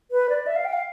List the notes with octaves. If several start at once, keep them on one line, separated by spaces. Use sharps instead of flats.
B4
D5
E5
F5
G5
F5